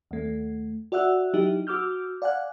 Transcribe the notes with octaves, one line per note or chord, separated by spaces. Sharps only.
D#2 A3
F#4 D5 E5 F#5 E6 F#6
F#3 D#4 E4 G4
F#4 D6 E6 F6 G6
D5 F5 F#5 G#5 F#6